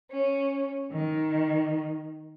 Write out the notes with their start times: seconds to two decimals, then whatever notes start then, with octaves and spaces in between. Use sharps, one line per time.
0.11 C#4
0.91 D#3